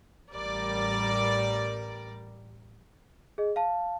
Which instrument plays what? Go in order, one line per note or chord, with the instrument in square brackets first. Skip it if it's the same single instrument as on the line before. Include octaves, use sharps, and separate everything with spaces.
[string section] A1 G3 A#4 D5
[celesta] G#4 D#5
F5 A5